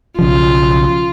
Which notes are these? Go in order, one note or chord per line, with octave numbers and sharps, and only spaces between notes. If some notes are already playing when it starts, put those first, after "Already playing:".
B1 C#3 F3 F4